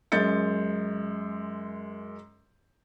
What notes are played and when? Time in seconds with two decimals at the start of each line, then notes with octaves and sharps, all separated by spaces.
0.12 F#2 G#3 G6 A6 C#7